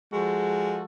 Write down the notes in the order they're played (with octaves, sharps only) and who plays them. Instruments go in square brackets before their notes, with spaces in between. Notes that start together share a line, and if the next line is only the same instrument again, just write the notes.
[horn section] F3 F#4 A4 [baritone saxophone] G#3